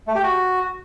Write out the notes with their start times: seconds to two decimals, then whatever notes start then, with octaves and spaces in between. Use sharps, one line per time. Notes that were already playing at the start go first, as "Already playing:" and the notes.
0.07 A3
0.15 G4
0.24 F#4